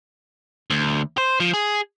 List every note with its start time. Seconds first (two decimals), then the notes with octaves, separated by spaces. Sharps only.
0.70 D2
1.18 C5
1.40 F3
1.54 G#4